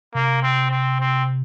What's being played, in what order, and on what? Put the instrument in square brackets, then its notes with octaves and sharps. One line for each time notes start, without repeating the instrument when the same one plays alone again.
[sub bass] C3 [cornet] A#3
[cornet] C4
C4
C4